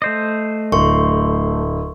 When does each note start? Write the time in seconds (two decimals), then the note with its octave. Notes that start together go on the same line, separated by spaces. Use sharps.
0.02 A3 C5 D#5
0.72 D1 C6 C#6